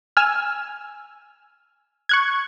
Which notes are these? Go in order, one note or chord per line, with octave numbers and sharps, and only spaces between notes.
G#5 E6 F6
C#6 F#6 G#6